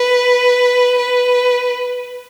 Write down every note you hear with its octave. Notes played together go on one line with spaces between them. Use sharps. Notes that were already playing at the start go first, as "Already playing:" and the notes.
Already playing: B4
B4